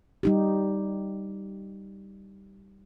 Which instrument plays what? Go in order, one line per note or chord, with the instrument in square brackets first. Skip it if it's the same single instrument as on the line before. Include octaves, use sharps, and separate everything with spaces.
[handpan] G3 D#4 G4